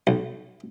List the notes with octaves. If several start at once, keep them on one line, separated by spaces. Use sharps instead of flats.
B1